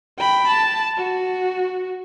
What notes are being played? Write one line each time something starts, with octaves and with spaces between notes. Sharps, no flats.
G5 B5
A5
F#4